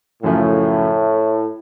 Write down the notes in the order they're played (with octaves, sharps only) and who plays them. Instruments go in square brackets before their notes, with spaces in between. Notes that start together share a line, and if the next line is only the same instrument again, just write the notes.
[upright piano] F#2 C#3 F3 A3 C#4 [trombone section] A2